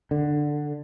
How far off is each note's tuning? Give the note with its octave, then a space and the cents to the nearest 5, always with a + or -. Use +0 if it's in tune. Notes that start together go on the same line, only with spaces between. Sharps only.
D3 +10